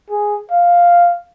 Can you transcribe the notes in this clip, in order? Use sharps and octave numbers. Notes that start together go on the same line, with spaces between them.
G#4
F5